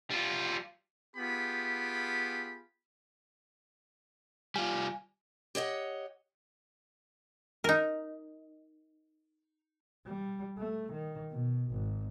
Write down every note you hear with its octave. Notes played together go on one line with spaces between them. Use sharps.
G3 F4
B3 F4 G4 G#4 B5
G3 F4 G#5
G4 C#5 D#5 F#5
D#4 A#4
G3
A3
D#3
B2
G#1